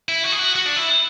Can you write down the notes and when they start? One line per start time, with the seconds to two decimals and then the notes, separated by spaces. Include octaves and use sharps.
0.09 E4
0.24 F#4
0.32 G#4
0.39 F#4
0.56 F#4
0.66 D4
0.76 E4